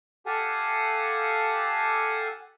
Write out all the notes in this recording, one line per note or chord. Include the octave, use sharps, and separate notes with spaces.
G4 A4 F5 F#5 G#5 A5